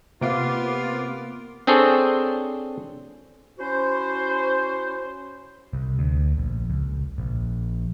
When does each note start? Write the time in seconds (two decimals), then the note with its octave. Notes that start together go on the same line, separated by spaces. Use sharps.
0.21 C3 A#3 B3 F4 D6
1.67 C4 D4 G#4 A4 C5 C#5
3.59 C#4 E4 F#4 C5
5.73 C2
5.99 D2
6.38 A#1
6.70 C#2
7.18 A#1